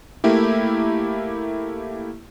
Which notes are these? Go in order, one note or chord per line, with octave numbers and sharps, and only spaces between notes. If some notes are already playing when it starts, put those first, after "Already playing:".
A3 A#3 E4 G4